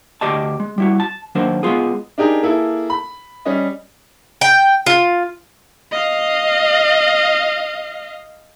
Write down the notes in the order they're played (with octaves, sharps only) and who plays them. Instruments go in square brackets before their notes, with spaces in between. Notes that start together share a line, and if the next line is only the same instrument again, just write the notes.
[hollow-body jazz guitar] D2 G4 D5 D#5 A5
G#3
G3 E4 F#4
A5
D#3 F#3 A#3 D4 C5
G#3 B3 F4 G#4
[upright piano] D4 D#4 G4 G#4 A#4
A#3 E4 G#4 A4
B5
G3 C#4 D#5
[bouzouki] G5
F4
[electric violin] D#5 F5